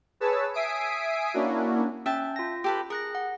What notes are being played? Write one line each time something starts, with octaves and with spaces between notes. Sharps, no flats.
G#4 B4 C#5 A5 E6
E5 G#5 D#6 B6 C7 D7
A#3 C#4 D4 E4 F#4
C#4 E5 G5 A5
F4 A#6
G4 A4 B4
G#4 A#4 F#6 A#6
F#5